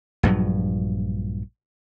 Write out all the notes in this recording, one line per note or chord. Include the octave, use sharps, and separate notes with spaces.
A#1 G2 F3 F#3